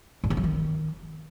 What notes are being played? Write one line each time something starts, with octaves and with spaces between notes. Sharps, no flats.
G2
D3
F#3
D#3